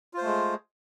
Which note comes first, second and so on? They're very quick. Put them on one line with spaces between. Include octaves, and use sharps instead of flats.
F4 C5 A3 G#3